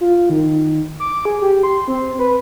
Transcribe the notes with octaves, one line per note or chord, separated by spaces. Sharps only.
F4
D#3
D6
G#4
G4
C6
C4
B4